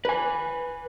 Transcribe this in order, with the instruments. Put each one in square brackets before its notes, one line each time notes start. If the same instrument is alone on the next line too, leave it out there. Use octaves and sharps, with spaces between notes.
[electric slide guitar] B4 G#5